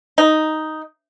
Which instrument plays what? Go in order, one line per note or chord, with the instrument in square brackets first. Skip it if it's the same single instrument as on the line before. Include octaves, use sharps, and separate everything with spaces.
[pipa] D#4